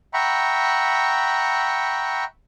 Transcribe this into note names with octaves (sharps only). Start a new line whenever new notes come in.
E5 F#5 G5 A#5 B5 C#6